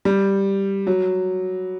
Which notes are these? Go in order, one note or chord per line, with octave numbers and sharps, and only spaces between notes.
G3
F#3